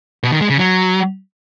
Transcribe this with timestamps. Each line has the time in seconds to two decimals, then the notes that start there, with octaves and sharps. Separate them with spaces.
0.23 B2
0.32 D#3
0.41 G#3
0.50 C#3
0.58 F#3